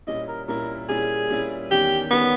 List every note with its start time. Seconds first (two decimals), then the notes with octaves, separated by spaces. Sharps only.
0.07 A#2 G3 C#4 E4 D#5
0.28 A#4
0.48 A#2 G3 C#4 E4 A#4
0.88 A#2 G3 C#4 E4 G#4
1.29 A#2 G3 C#4 E4
1.70 E2 D#3 G3 C#4 G4
2.11 E2 D#3 G3 B3 C#4